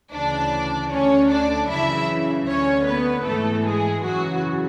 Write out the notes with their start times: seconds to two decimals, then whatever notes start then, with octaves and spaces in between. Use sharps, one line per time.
0.12 D2 C#3 E3 D4 D5
0.90 D2 D3 C#4 C#5
1.29 D4 D5
1.69 F#2 C#3 E3 E4 E5
2.47 D2 D3 C#4 C#5
2.86 B3 B4
3.25 G#2 E3 A3 A4
3.65 G#3 G#4
4.04 F#2 C#3 E3 F#3 F#4